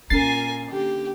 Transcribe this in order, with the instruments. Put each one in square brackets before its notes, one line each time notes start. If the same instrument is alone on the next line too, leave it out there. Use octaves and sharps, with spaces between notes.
[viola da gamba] A#2 F4 [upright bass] B3 C#4 [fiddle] A#4 G#5 [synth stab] A6 C7
[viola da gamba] D3 A#3 [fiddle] G4